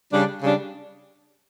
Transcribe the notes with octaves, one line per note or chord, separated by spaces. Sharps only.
C#3 G3 D4
C#3 G3 D4